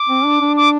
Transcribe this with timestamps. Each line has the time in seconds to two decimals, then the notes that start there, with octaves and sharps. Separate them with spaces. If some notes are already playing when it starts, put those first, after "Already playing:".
Already playing: D6
0.09 C4
0.25 D4
0.41 D4
0.57 D6